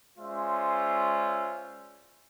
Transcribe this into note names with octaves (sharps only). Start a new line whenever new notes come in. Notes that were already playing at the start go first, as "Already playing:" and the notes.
G#3 C#4 F4 C5 D5 E5